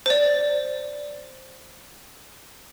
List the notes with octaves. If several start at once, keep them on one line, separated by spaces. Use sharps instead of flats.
C5 D5